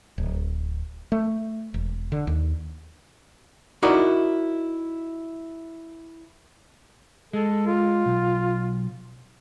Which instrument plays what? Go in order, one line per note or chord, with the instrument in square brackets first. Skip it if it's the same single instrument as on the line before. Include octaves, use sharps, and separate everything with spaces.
[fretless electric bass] D1
A3
E1
D3
D#2
[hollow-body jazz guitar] D#4 E4 F#4 A#4 D5 D#5
[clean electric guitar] G#3 [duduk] A4
[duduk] F4
[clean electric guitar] B1